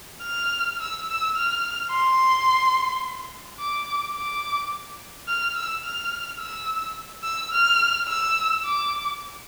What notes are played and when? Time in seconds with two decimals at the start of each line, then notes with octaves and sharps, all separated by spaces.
0.23 F6
0.80 E6
1.08 E6
1.36 F6
1.91 C6
3.60 D6
4.17 D6
5.28 F6
5.56 E6
5.84 F6
6.40 E6
7.24 E6
7.52 F6
8.08 E6
8.65 D6